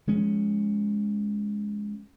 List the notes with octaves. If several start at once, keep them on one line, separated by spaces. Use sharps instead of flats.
F3 G#3 C#4